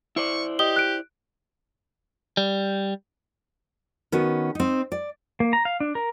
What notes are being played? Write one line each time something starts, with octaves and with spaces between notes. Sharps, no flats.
E4 C5 D5 C#6
G4 D#5 D#6 G7
F#6 D7
G3
D#3 B3 C#4 F#4
C4 D#4
D5
A#3
A#5
F5
D4
A#4